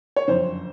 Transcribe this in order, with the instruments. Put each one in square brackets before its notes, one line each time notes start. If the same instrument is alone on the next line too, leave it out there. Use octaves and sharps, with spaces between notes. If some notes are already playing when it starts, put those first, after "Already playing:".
[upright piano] C#5
[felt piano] F#1 F2 D3 [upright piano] C5